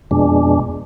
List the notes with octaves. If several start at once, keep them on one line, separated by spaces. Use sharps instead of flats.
F2 B2 G#3 D4